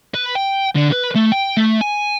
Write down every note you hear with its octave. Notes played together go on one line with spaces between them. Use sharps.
B4
G5
D3
B4
A3
G5
A3
G#5